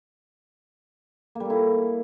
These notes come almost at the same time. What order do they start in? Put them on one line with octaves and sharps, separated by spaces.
A#3 G3 A4 E4